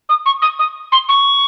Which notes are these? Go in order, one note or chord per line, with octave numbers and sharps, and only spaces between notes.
D#6
C#6
D#6
D#6
C6
C#6